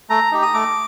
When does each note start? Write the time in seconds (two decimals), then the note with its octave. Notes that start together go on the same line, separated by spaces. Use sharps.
0.10 A3 A#5
0.32 D#4 G4
0.42 D#6
0.54 A3 D6